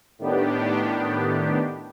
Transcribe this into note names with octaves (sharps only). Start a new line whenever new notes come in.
A2 D#3 B3 D4 G4